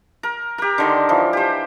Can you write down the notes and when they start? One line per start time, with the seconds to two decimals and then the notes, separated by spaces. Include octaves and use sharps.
0.23 A#4
0.58 G4 A#4
0.78 D3 D#3 C6
1.09 E3 F3
1.33 G4 C5